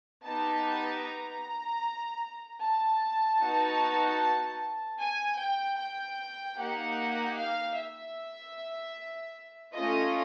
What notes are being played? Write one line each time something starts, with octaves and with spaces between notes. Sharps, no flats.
B3 D#4 G4 A5
A#5
A5
B3 D#4 F#4
G#5
G5
G5
A#3 D#4 G4 F#5
F5
E5
A3 C#4 F4 D#5